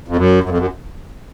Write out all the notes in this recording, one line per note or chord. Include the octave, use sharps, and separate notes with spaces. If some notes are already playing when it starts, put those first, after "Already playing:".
F2
F#2
F#2
F2
F#2